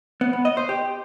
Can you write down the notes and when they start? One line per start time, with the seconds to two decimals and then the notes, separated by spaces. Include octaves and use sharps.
0.21 B3
0.33 B3
0.45 D#5
0.57 C5
0.69 G4